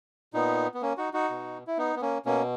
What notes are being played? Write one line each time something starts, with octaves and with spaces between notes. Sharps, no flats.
A#2 B3 D#4
B3
A#3 C#4
D#4 F#4
D#4 F#4
B2
E4
B3 D#4
B3
A#3 C#4
B2 A#3 C#4